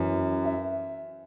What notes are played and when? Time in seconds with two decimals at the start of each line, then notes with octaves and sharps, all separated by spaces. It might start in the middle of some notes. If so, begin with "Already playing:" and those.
Already playing: F#2 E3
0.45 E5